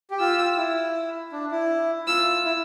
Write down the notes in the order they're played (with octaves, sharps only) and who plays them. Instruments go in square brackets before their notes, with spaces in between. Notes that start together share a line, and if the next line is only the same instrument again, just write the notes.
[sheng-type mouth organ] G4
[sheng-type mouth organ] F4 [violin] E6
[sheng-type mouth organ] E4
D4
E4
[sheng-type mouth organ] F4 [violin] E6
[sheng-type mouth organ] E4